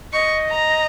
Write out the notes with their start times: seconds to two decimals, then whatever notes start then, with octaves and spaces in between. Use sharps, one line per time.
0.13 D#5 C#6
0.50 A#5